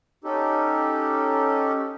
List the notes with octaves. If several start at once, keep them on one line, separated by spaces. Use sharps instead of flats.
C#4 D#4 G4 A4